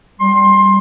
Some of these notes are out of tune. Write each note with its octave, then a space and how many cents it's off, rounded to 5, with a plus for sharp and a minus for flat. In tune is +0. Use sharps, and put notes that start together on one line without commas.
G3 +0 C6 +20